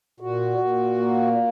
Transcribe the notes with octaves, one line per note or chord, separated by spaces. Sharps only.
A#2 F#4
A#2
A#3